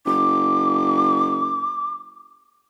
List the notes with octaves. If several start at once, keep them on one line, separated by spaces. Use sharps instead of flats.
F#1 D6